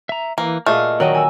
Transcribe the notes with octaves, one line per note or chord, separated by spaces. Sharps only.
E5 A#5
E3 A#3
A#2 A3 F#4 G#4 D#5 F5 F6
D#3 F#3 F#4 A#4 D5 D#5 G5
G#5 E6